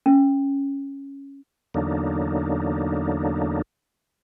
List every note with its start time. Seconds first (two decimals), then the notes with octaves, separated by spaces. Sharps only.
0.06 C#4
1.74 E2 D3 F#3 A#3 D4 D#4